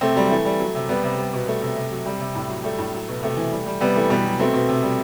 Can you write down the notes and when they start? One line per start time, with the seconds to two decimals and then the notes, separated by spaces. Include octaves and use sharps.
0.01 C3 A3 C4
0.16 F#3 G3
0.30 E3 A3
0.45 G3
0.60 F#3
0.75 C3
0.89 C3 G3 B3
1.04 C3
1.18 G3
1.33 B2
1.47 G3 A3
1.62 C3
1.77 C3
1.91 F#3
2.06 C3 G3
2.20 C3
2.35 A2
2.49 F#3
2.64 G3 A3
2.79 A2
2.93 F#3
3.08 B2
3.23 C3 A3
3.37 E3
3.52 G3
3.66 G3
3.81 C3 G3 B3
3.96 E3 A3
4.10 B2 G3 B3
4.24 F#3
4.39 B2 A3 C4
4.53 B2
4.68 C3
4.83 G3